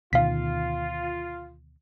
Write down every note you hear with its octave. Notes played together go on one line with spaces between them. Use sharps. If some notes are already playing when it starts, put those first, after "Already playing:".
D2 B2 D#3 F4 F5 B6